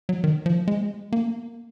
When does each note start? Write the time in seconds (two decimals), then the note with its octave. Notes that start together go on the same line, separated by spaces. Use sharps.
0.09 F#3
0.24 D#3
0.46 F3
0.68 G#3
1.12 A#3